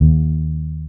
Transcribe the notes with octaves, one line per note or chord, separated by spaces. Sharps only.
D#2